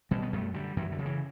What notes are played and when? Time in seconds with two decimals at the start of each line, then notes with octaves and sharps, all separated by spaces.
0.11 B2 G3
0.22 B3
0.32 F#2 A3
0.54 D3 G3
0.76 F#2 E3
0.92 D3
0.98 C#3
1.05 E3